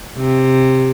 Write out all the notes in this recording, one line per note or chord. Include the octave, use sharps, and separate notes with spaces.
C3